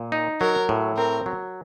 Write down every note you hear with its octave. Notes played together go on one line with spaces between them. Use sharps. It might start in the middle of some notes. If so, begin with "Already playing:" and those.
Already playing: A#2
D#4
F#3 A#4
A2
C4 A#4
F#3